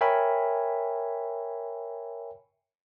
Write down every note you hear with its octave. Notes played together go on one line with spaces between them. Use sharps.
A#4 C#5 E5 G5 G#5 B5